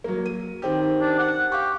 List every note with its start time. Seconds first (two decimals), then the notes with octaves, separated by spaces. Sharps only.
0.04 F#3 A#3
0.26 D#7
0.62 D#3 C4 G4
1.01 D4
1.19 F#5
1.52 G4 F5 C#6